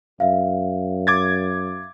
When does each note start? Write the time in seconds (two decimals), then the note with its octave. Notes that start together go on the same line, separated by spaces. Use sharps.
0.20 F#2 E5 F5
1.07 D6 G#6 A6